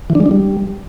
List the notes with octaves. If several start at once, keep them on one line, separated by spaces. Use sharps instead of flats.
E3
D4
G#3
D4
G3